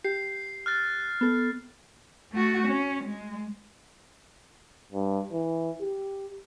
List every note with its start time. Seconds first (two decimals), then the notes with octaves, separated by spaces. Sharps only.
0.04 G4 C7
0.66 F6 F#6 A6
1.21 B3 A4
2.32 A3 F#4
2.68 C#4
3.04 G#3
4.92 G2
5.32 E3
5.81 G4